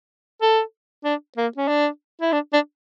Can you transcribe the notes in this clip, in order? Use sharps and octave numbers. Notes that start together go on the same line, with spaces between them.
A4
D4
A#3
C#4
D4
E4
D4
D4